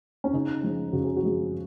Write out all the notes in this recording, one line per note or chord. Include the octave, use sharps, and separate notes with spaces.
C#4
C#3 D#4
F3 G#3
C#3 F#4
G#4
F#4
F3 G#3